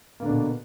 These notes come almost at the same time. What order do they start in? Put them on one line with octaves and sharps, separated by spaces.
A#3 D3 D4 B2